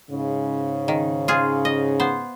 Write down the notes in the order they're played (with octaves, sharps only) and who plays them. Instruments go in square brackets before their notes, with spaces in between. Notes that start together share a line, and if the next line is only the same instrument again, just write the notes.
[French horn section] G#2 C#3
[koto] D#3
F4 G#4
D#5
B3 C5